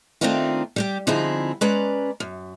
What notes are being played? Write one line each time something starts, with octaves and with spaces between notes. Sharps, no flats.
D#3 A3 C4 D4 D#4 F4
G3 G4 G5
D3 F3 C4 D#4 E4 G#4
G#3 C#4 B4 D5 A#5
F#2